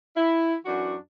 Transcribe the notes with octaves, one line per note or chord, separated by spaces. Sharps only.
E4
F#2 E3 D4 F#4